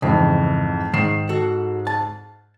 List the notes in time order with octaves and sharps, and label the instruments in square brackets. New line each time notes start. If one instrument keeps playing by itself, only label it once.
[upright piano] F2 G#2 E3 [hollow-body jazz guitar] C#3
[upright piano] G#2 C7 E7 [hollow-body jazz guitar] D#3
[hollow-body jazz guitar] F#4 A4
A5